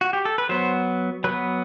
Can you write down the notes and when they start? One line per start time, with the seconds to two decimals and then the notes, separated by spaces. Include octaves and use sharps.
0.01 F#4
0.13 G4
0.25 A4
0.38 B4
0.49 F#3 B3 C5
1.24 F#3 B3 B4